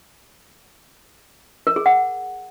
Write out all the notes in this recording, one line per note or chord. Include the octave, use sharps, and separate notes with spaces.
A#4
G#4
F#5